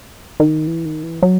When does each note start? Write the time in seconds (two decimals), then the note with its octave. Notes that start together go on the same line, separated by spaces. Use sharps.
0.40 D#3
0.67 E3
0.85 D#3
1.03 E3
1.22 F#3